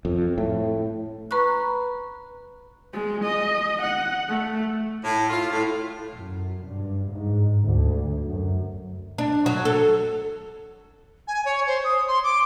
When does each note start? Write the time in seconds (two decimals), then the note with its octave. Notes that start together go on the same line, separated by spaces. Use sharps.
0.05 F2
0.38 A2
1.31 B4 A#5 B5 C#6 F#6
2.93 G#3
3.24 D#5
3.82 F#5
4.29 A3
5.04 A2
5.30 F4
5.51 A2
6.13 F#2
6.65 G2
7.10 G#2
7.65 D2
8.26 F#2
9.18 D4
9.46 F#3
9.65 A4
11.28 G#5
11.45 C#5
11.67 C5
11.84 D#6
12.08 C6
12.23 D6